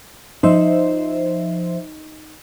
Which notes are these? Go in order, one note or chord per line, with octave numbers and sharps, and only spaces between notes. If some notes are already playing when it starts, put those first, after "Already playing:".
F3 D#4 C5 E5